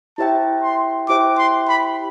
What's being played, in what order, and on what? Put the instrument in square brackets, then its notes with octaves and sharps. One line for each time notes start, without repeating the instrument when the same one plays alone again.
[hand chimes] E4 G4 C5 E5 G5 [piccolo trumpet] A5
[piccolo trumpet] C6
[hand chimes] E4 G4 C5 E5 G5 [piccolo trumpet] D6
[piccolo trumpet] C6
B5